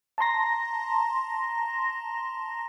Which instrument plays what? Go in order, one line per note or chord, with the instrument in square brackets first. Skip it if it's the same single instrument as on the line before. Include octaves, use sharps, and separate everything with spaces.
[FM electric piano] A5 A#5 C6 A#6